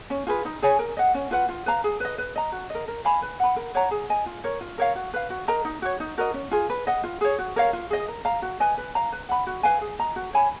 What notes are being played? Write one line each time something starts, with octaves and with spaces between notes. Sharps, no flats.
C#4
F4 G#4 B4
D#4
G#4 C#5 G#5
A#4
D#5 F#5
C#4
F4 B4 F#5
F4
B4 F5 A#5
G#4
B4 D#5
B4
D#5 A#5
F#4
A#4 D#5
A#4
F5 G#5 B5
B4
F#5 B5
A#4
C#5 F#5 A#5
G#4
D#5 G#5
F4
A#4 C#5
F4
A#4 C#5 F5
F#4
B4 F5
F#4
A#4 D#5 A#5
D#4
F#4 C#5
D#4
F#4 A#4 D#5
C#4
F4 G#4
B4
D#5 F#5
F4
G#4 C#5
F#4
A#4 C#5 F5
F4
G#4 D#5
A#4
F5 A#5
F#4
B4 D#5 G#5
B4
F5 A#5
B4
F#5 B5
F#4
B4 F5 G#5
G#4
D#5 A#5
F#4
C#5 G#5 B5